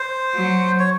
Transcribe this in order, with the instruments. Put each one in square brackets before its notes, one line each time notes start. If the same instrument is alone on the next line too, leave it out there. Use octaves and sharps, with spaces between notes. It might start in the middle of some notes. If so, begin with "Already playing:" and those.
Already playing: [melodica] C5
[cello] F#3
[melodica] C#5